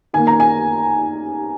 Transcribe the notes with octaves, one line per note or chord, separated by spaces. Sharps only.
D#3 A#3 G#5
A#5
G#5